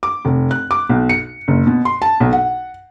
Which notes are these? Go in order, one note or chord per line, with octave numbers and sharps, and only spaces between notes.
D6
F1
F#6
D6
B1
C#7
F#1
B2
C6
A5
B1
F#5